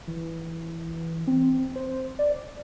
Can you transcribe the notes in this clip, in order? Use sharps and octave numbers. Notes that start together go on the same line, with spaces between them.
E3
C4
C5
D5